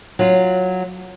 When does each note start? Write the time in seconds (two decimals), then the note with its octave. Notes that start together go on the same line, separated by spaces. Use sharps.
0.19 F#3 F4